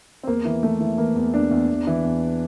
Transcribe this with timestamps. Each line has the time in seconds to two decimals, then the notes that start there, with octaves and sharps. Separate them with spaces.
0.23 C4
0.27 E2 A#3
0.45 E3
0.63 E3 A3
0.80 E3
0.98 E3 A#3
1.16 E2
1.34 E2 D4
1.51 E2
1.69 E2
1.87 E3
2.04 E2